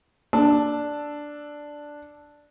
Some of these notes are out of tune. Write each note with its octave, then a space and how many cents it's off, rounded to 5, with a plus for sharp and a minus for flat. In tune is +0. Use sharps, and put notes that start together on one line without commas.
D4 +0 A5 +0 E6 +0